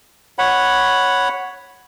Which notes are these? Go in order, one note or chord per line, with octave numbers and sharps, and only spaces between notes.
C#5 F#5 B5